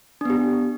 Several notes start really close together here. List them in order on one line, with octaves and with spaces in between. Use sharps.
D4 B3 G4